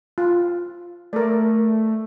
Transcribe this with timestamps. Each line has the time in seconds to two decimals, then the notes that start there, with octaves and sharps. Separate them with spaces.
0.18 F4
1.13 A3 A#4 D5